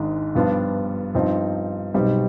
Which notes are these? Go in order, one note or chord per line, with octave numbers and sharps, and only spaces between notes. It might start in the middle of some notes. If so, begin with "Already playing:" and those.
Already playing: G#1 G#2 D#3 G#3 D4
G2 F3 B3 D4 F4
G2 F3 C4 D#4
B1 B2 G3 C4 D#4